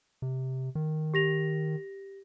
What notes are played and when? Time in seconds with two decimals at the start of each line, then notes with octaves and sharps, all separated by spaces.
0.22 C3
0.75 D#3
1.14 G4 A#6 F7